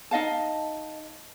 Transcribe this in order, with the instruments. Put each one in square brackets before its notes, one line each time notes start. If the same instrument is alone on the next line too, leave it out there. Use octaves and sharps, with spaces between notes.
[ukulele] D#4 D#5 F5 A5